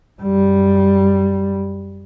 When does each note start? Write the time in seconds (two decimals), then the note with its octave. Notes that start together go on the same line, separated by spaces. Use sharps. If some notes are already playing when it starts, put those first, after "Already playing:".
0.21 F#2 G3